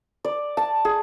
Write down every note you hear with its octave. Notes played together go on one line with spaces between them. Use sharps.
D5
A5
G#4